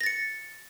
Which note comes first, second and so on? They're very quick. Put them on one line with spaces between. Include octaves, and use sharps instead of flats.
A#6 A6 C#7